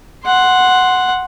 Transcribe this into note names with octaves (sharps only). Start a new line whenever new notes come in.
F#5 C6